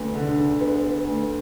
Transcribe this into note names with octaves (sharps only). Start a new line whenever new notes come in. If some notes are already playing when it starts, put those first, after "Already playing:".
Already playing: D2 B3
D3
D3
B3
B3
D2